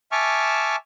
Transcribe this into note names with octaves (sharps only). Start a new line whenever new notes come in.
E5 G#5 A5 C#6 D6 F6